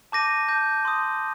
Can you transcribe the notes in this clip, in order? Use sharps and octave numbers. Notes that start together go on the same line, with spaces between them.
A5 D6 G6 A#6 D#7
A5 D6 G6 A#6 D#7
C6 D#6 G6